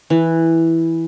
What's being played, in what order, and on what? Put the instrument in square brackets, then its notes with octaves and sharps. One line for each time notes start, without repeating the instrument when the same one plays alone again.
[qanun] E3